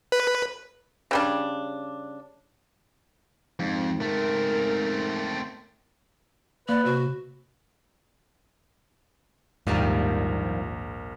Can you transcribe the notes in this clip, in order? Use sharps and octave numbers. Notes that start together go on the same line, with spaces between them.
B4
C#3 G3 D4
F2 G#2
A3 C4 A#4
A#3 B4 D5
C3 F#4
A#1 D#2 G#2 D#3 F3 G3 A#4